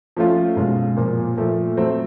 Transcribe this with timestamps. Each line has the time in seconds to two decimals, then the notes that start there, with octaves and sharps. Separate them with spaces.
0.17 F3 A3 C#4 F4
0.56 B2 G#3 C#4 F4
0.97 A#2 F3 A#3
1.37 A#2 F3 A3
1.77 F#3 A3 C4